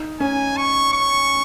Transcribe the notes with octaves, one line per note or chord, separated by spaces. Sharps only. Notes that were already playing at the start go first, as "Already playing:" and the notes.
Already playing: D#4
C#4 G#5
C#6
C#6